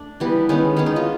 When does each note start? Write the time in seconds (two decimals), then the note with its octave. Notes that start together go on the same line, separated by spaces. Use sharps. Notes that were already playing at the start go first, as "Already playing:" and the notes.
Already playing: A3 D4
0.20 E3 G3 B3
0.49 D#3 G#3 B3 C#4
0.76 D#3 G#3 B3 C#4
0.86 D#4
0.96 F4